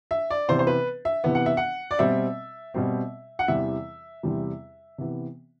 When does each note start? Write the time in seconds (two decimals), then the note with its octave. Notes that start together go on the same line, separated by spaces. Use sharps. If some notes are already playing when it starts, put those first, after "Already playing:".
0.11 E5
0.30 D5
0.48 C3 E3 B3 C5
0.59 C5
0.67 B4
1.05 E5
1.24 C3 E3 B3
1.35 F#5
1.46 E5
1.57 F#5
1.91 D5
1.99 B2 G3 C4 E5
2.74 B2 G3 C4
3.39 F#5
3.48 E2 C3 E3 G3 E5
4.23 E2 C3 E3 G3
4.98 C3 E3 B3